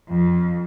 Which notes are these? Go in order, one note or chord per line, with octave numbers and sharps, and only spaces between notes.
F2